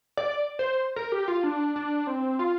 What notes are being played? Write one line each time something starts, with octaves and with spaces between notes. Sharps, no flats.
D5
C5
A#4
G4
F4
D4
D4
C4
F4